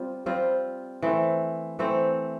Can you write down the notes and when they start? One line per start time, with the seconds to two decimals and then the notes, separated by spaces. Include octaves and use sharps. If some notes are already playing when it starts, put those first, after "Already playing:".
Already playing: G3 C4 F4
0.26 G3 C4 F4
1.02 E3 A3 C4
1.79 E3 A3 C4